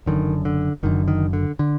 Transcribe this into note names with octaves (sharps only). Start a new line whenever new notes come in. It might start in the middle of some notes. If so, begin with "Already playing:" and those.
F#1 F#2 D3 D#3
D3
F#1 F#2 D3 D#3
D#3
D3
D3